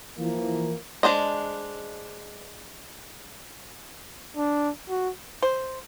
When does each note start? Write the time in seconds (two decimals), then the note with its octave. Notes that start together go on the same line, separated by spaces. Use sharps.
0.19 E3 F3 A#3
1.03 G#3 D4 C5 D#5
4.36 D4
4.89 F#4
5.42 C5